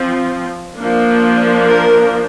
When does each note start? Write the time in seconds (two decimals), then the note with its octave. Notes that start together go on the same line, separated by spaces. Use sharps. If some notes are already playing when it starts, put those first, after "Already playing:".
Already playing: F3 C4
0.79 F3 A#3 D4
1.66 A#4